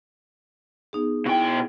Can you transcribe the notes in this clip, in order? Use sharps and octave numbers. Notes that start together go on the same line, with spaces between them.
B3 D#4 G#4
B2 E4 G5